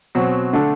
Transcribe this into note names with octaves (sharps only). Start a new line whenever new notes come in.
B2 F#3 C4
D3 A3 D4 A4